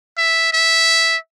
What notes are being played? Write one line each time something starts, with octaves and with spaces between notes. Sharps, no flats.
E5
E5